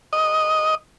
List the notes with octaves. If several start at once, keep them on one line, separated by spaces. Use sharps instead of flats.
D#5